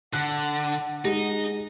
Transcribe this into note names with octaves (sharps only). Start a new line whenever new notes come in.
D3 F#5 F#6
G#3 D#4